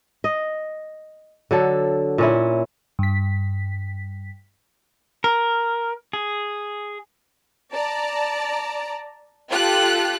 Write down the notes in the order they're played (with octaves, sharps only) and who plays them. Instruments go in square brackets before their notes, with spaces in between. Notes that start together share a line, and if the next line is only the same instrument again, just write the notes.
[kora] D#5
D3 F#3 A4
A#2 C#4 E4
[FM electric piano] G2 B6
[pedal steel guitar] A#4
G#4
[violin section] D5 A5 A#5
F4 G4 A4 F#6